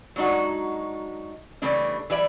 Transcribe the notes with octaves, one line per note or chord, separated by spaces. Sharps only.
F#3 G#3 D4 D#4 F#4
C#3 E3 G3 A3 D4
E3 G3 D5 E5